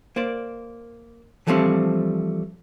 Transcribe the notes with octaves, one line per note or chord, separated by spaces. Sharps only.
A#3 C5 D5
E3 F3 G3 A3 C4 D4